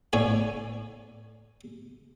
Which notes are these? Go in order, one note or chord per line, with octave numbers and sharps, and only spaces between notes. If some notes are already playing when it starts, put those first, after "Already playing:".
A2 C#5 D5 G#5